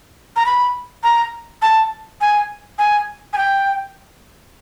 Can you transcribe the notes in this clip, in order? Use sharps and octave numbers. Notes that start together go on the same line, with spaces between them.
A#5
B5
A#5
A5
G#5
G#5
G#5
G5